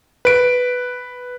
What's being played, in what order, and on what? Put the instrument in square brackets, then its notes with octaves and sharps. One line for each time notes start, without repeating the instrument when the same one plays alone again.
[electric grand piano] B4 D7